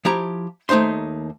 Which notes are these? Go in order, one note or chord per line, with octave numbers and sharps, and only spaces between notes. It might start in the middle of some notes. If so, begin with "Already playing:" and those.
F3 E4 G4 A#5
D#2 A3 D#4 C5 C6